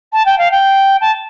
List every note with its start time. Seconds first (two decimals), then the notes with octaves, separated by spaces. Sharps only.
0.12 A5
0.25 G5
0.38 F5
0.51 G5
1.00 A5